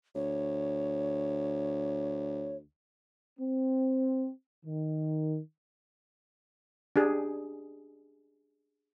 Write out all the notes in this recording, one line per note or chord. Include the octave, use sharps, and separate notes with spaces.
D2 C#5
C4
D#3
D4 G4 G#4